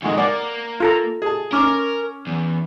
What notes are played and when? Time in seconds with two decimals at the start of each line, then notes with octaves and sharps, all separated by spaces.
0.03 F2 D#3 G#3 F#4 G#5
0.18 A#3 D5 F#5
0.80 F4 A4 A#5
1.22 G#4 A5
1.52 C#4 A#4 D6 F6
2.27 E2